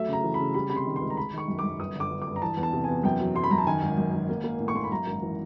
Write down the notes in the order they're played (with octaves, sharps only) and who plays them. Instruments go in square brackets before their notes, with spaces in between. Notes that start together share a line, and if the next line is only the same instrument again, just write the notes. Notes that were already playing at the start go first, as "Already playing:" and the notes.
Already playing: [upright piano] F#3 A3 E5
C#3 A#5
E3
B5
C#3
G3 B5
C3 B5
C6
D#3
C6
C#2
A#5
G#3 B5
D#3 C#6
F#2
D6
F#2
G1 D#6
D3
D6
G1
D6
G2
A#5
E3 A5
E2
A5
C3
E2 G#5
F#2 G5
F#3
F#3 C6
B5
F#2 A#5
A5
D#3 G#5
G#1
F#2
G#1
A#3
A#3
A2
C#6
A#3 C6
B5
F#2 A#5
G#1
E3